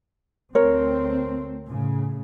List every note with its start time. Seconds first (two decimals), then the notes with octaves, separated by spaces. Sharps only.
0.55 D2 A3 C4 A#4 C#5
1.66 A2 C#3